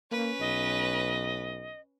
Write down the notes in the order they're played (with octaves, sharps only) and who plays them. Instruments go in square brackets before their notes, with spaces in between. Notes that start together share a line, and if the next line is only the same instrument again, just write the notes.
[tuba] A#3 [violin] C#4 B4
[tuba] B1 [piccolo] D#5